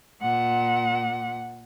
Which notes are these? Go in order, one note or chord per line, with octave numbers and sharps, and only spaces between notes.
A#2 F#5